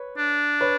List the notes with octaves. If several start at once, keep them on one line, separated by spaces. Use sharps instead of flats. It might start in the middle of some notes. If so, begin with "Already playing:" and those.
Already playing: B4 C#5
D4
B4 C#5